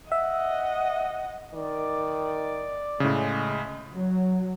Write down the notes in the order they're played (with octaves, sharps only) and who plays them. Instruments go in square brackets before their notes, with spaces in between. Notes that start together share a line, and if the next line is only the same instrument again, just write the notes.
[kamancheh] D#5 F#5 [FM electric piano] E5
[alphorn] D#3 [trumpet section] D5
[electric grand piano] A2 C#3 [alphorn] G#3
[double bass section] F#3